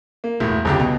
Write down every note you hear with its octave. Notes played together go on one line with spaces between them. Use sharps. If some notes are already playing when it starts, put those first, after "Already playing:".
A#3
E1 A2
G1 C#2 G4
B2